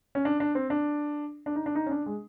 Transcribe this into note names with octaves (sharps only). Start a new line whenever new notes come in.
C#4
D4
D4
C4
D4
D4
D#4
D4
D#4
C#4
D4
G#3